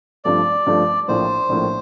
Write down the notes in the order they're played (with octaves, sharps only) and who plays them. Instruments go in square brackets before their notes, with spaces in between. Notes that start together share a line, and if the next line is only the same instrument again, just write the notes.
[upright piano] G2 F3 A3 [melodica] D5
[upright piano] G2 F3 A3
[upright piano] A#1 A2 F3 A#3 [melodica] C5
[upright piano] A#1 A2 F3 A#3